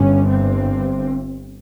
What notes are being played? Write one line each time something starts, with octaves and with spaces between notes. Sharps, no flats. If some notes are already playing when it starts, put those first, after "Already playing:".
Already playing: G1 G2 C#4
C4